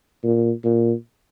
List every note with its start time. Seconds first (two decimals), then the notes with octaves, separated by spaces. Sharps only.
0.23 A#2
0.64 A#2